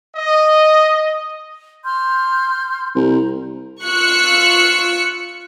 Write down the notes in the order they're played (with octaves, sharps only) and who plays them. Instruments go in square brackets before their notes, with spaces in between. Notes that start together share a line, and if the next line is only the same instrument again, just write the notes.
[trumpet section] D#5
[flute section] C6 F6 G6
[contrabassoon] C2 [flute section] A#5
[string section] F4 C#6 E6 F#6 C#7